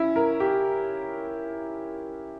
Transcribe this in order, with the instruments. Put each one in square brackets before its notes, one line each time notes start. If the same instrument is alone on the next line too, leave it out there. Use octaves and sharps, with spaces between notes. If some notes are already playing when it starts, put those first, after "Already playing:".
Already playing: [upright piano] C#4 E4
A#4
G4